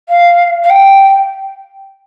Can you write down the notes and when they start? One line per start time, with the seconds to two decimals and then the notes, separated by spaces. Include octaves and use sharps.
0.08 F5
0.63 F5
0.69 G5